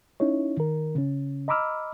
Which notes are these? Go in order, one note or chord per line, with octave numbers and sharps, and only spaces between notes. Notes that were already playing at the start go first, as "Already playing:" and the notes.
C#4 D#4 E4 C#5
D#3 A#4
C#3 C#4
D#5 A#5 B5 D6 E6 F6